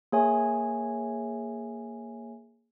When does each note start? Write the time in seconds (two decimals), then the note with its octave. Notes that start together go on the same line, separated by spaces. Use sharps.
0.12 A#3 G#4 C#5 E5 G#5